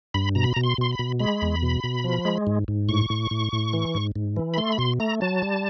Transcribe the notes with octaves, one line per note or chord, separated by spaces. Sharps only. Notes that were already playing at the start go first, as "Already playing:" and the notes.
G2 B5
B2 A#5
B5
A#5
B2
C6
B2 C6
B5
B2
G#3 B5
E2
B2
B2
F3
G#3
G#2
G#2
A2 C#6
A2
A2
A2
E3
G#2
G#2
E3
B5
A3 C6
B5
B2 C6
A3 A#5
F#3 A5
G3